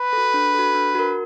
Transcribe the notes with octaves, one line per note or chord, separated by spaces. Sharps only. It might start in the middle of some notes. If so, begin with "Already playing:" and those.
Already playing: B4
F#4 A4
D4
F#4 A4
D4
F#4 A#4